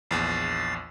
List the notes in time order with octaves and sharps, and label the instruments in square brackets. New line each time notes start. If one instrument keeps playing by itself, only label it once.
[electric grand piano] A#1 E2 [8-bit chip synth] A6 C7